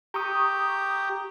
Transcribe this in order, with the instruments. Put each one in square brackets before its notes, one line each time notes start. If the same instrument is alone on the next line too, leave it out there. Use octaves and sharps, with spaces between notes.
[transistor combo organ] G4 [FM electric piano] A#5 C#6 D#6